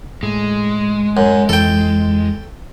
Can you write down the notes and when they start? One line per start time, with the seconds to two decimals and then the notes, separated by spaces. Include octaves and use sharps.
0.23 A2 G#3
1.17 F#2
1.49 F2 E3 A4 G5